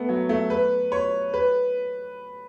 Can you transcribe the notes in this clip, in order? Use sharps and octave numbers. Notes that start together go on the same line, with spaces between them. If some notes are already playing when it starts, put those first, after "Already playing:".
Already playing: A3 B3
F#3
A3
B4
C#5
B4